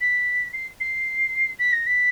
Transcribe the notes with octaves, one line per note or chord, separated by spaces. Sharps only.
B6
C7
C7
B6
A#6
B6